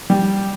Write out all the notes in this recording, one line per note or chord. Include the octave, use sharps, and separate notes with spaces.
G3